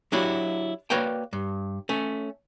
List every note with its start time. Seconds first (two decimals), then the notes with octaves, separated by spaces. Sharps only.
0.12 F#3 D4 E4 F#4 G4
0.90 A#3 F#4 B4 C#5 D5 G5
1.33 G2
1.89 A3 C#4